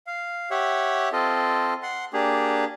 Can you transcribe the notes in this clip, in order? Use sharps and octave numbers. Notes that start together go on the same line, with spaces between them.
F5
G4 C#5 E5 F#5
C4 F4 A4 D#5
F#5 C6
A#3 D4 G4 G#4